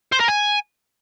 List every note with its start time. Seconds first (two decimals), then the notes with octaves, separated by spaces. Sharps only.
0.12 C5
0.20 A#4
0.28 G#5